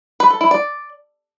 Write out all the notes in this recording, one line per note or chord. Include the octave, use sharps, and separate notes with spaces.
B4
A4
E4
D5